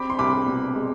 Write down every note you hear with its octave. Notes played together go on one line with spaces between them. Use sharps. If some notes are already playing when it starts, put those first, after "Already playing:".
Already playing: C4 B5 D6
C6
C2 B5 D6
B2
G#3